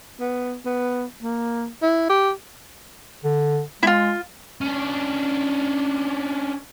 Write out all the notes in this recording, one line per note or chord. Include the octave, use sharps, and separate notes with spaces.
B3
B3
A#3
E4
G4
D3
G#3 E4 F4
C#4 D4